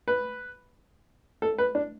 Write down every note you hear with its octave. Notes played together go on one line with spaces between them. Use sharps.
B4
A4
B4
D4